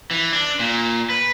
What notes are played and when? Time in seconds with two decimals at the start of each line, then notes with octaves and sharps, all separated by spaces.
0.11 E3
0.33 D4
0.59 A#2
1.10 B4